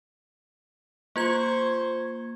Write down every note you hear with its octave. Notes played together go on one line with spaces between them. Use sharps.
A#3 F4 C5 C#6 G#6